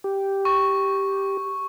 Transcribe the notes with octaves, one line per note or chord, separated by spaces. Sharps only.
G4
C#6